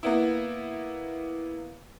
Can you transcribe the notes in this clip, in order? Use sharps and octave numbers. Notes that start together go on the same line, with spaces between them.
A#3 B3 E4